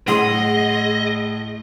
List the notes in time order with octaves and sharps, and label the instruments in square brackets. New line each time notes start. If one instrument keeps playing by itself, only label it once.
[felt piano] A2 [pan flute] G#4 [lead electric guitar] D#5 [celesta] F#5 C6